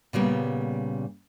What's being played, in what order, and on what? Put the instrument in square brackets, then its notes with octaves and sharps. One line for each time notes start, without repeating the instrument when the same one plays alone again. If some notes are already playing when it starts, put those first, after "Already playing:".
[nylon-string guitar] A#2 C#3 G3 A#3 B3